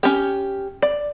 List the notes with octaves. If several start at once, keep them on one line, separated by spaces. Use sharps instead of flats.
C#4 G4
D5